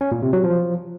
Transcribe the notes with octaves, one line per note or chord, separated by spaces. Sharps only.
C#4
A#2
C3
F#3
F3